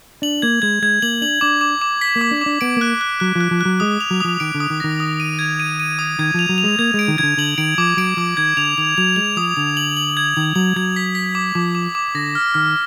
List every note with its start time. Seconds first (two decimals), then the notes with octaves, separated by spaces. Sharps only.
0.22 D4 F#7
0.42 A#3 G#6
0.62 G#3 G#6
0.82 G#3 G#6
1.02 A#3 F#7
1.22 D4 F#7
1.41 D4 D6
1.61 D6
1.81 D6
2.01 B6
2.16 A#3
2.21 D6
2.31 D4
2.41 D4 D6
2.61 B3 D7
2.77 A#3 F#6
3.01 F#6
3.20 F#3 F#6
3.35 F3
3.41 F#6
3.51 F3
3.61 F#3 F#6
3.80 G#3 D#6
4.01 F7
4.11 F#3
4.20 F3 D#6
4.40 D#3 D7
4.55 D3
4.60 D#6
4.70 D#3
4.80 D#3 A#6
5.00 D#6
5.20 D#7
5.39 G#6
5.60 D#7
5.80 D#7
5.99 D#6
6.19 D#3 G#6
6.34 F3 F7
6.49 F#3
6.58 F7
6.64 G#3
6.79 A#3 G#6
6.94 G#3 D7
7.08 D#3
7.18 D#3 G#6
7.23 D3
7.37 D3 F#7
7.58 D#3 D7
7.78 F3 D6
7.97 F#3 D7
8.17 F3 D6
8.37 D#3 G#6
8.57 D3 F7
8.78 D#3 F7
8.98 F#3 F7
9.16 G#3 F7
9.36 F3 D#6
9.56 D3 F7
9.77 F#7
9.97 F#7
10.17 G#6
10.37 D#3 F#7
10.55 F#3 F#7
10.76 F#3 G#6
10.96 B6
11.15 B6
11.35 D6
11.55 F3 D6
11.75 D6
11.95 D6
12.15 D3 A#6
12.35 F6
12.54 D#3 F6